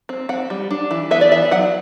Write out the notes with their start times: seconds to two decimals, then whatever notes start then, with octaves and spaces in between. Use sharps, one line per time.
0.09 C4
0.29 C4 F#5
0.50 G3
0.71 D4
0.91 E3
1.11 B3 E5
1.21 D5
1.32 E3 E5
1.51 F#3 F#5